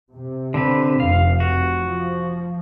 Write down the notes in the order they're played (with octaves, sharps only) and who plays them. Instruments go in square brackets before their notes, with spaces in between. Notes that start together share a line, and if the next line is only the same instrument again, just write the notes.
[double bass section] C3
[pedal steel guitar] D3 C4 B4
[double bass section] F1 [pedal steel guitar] F5
[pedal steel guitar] F#4
[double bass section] F3